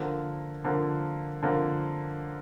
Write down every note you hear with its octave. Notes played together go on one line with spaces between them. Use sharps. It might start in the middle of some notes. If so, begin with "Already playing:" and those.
Already playing: D3 F3 A#3
D3 F3 A#3
D3 F3 A#3